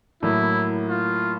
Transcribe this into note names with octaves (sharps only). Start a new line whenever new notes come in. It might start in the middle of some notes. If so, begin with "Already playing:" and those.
A2 F#3 A#3 E4
F4